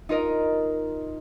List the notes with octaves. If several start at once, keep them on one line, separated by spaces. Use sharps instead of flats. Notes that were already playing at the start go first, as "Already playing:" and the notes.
D#4 F4 A#4 D#5